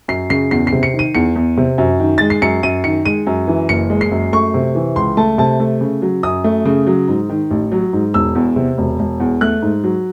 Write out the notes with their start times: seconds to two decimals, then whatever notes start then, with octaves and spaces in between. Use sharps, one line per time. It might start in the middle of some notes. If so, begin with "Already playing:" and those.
0.08 F#2 C7
0.30 C#3 C7
0.51 E2 C7
0.67 C7
0.72 C3
0.83 C#7
0.94 D#3
0.99 D#7
1.15 E2 C#7
1.36 E2
1.57 C3
1.78 F#2
2.00 D#3
2.18 G#3 A6
2.30 C7
2.42 F#2 C#7
2.63 F#2 D#7
2.84 D#3 C#7
3.05 G#3 D#7
3.27 F#2
3.48 E3
3.69 F#1 C#7
3.90 G#3
4.01 C7
4.11 F#2
4.33 A3 C#6
4.54 C3
4.75 E3
4.96 C#2 C6
5.17 A3 A5
5.38 C3 A5
5.60 A3
5.81 C#3
6.02 F#3
6.23 F#2 D#6
6.44 A3
6.65 C#3
6.87 F#3
7.08 G#2
7.29 D#3
7.51 A1
7.72 F#3
7.93 G#2
8.14 E1 E6
8.35 E2
8.56 C3
8.78 E1
8.99 E1
9.20 E2
9.41 A3 F#6
9.62 G#2
9.84 F#3